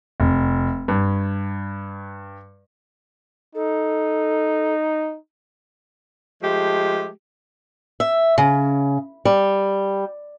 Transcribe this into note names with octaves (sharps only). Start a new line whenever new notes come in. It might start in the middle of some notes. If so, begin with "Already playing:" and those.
F1
G2
D#4 A4
F3 G#3 A3 G4
E5
C#3
G3